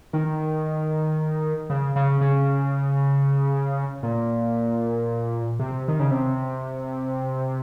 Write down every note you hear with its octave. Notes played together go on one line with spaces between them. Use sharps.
D#3
C#3
C#3
C#3
A#2
C3
D#3
C#3
C3